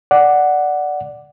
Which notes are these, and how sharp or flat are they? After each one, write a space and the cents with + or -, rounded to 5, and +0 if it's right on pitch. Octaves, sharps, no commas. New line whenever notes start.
D5 +0 F#5 +0